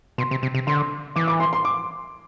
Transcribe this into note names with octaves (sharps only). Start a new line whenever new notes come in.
B2 C6
C3
C3
C3
D3 C6
E3 D6
D6
C6
C6
D6